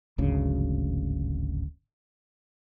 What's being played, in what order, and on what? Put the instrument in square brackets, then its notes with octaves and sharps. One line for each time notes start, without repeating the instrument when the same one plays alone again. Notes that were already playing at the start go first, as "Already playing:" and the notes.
[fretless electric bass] D1 G#1 D2 C#3